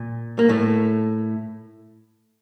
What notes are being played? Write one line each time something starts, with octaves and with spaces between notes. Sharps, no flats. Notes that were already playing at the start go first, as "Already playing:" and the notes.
Already playing: A#2
A#3
A2 A3